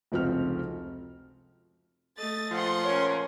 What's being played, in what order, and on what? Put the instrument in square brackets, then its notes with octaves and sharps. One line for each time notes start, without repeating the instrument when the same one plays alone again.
[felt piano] F1 C#2 F3 C4 F#4 F6
[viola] A3 D#5 [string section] A6
[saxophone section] A#2 F3 [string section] F#5 C6
[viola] C#4 A#4 [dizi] C#5